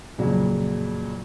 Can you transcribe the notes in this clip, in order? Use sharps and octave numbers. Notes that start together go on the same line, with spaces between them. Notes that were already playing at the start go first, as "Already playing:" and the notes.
F2 A#2 C#3 F#3